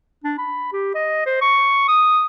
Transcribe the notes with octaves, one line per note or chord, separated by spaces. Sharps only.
D4
B5
G4
D#5
C5
C#6
D#6